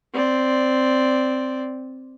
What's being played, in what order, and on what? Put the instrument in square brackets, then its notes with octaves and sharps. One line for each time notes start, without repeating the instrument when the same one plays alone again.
[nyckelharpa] C4 D5